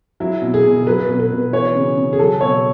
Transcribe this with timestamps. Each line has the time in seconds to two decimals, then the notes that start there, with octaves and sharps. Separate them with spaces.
0.20 F#3 E4
0.42 B2
0.54 G#4
0.65 B2
0.86 F#3 B4
1.08 B2
1.20 B4
1.31 B2
1.52 E3 C#5
1.75 C#3
1.97 C#3
2.13 G#4
2.19 F#3 A4
2.41 B2 C#5